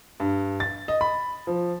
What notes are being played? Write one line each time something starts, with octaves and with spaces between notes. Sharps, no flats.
G2
A6
D#5
B5
F3